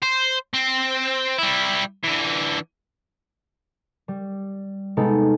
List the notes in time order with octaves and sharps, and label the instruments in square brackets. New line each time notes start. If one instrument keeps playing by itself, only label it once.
[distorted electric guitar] C5
C4
G3 E4
D3 E3
[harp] G3
C3 G#3 B3 D#4 A4